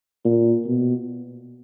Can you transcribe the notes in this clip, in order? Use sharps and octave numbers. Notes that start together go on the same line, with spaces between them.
A#2
B2